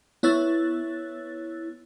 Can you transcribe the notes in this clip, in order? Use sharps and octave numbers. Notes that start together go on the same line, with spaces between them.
B3 E4 C#5 E6 F#6 A6